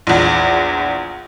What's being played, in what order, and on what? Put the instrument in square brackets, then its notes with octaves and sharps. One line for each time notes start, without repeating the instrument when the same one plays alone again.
[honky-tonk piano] A#1 E2